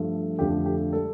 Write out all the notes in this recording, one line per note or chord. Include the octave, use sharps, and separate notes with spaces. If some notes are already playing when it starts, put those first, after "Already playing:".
Already playing: G2 F3 A3
F2 D3 F3 A3 G4
G4
G3 A4